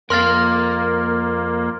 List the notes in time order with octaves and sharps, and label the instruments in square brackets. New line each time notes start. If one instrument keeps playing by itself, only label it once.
[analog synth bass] F2 [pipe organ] A#3 [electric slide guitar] A#4 F5 [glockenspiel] C6 F6 A6